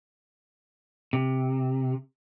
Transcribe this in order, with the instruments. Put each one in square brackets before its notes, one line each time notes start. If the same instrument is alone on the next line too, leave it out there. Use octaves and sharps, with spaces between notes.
[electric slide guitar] C3